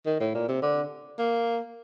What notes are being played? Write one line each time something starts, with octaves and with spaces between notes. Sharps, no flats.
D#3
A2
A#2
C3
D3
A#3